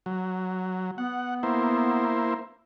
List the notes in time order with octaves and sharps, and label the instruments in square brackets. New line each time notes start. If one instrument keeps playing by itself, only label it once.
[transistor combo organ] F#3
[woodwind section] B3 [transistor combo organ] F#5
[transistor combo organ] A#3 E4 C5